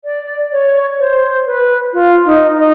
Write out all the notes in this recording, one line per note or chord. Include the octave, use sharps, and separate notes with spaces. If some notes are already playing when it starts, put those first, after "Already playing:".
D5
C#5
C5
B4
F4
D#4
D#4